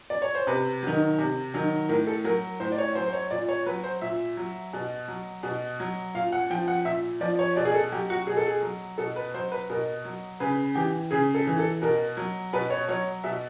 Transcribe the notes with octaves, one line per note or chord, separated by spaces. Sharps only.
D5
C#5
C5
C3 B4
D#3 F#3
C3
D#3 F#3
A2 A#4
A4
F#3 A#4
A2 C5
D5
C#5
F#3 C5
C5
C#5
A#2 D5
C#5
F#3 B4
C5
A#2 E5
F#3
B2
F#3
B2
F#3
A#2 F5
F#5
F3 G5
F#5
A#2 E5
F3 D5
C#5
B2 D5
G#4
A4
F#3 G4
F#4
B2 G#4
A4
G#4
F#3
B2 A4
B4
F#3 C5
B4
B2 A#4
F#3
C#3 B4
E3 G4
C#3 G#4
A4
E3
A4
B2 A#4
F#3
B2 B4
C#5
F#3 C#5
B2 E5